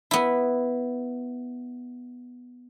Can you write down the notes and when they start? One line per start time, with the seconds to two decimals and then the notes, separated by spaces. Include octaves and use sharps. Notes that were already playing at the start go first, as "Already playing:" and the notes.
0.11 B3 E4